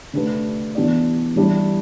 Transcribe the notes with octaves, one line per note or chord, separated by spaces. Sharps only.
D3 A3 D4 G4 B4
E3 B3 D4 G4 D5
E3 G3 D4 G4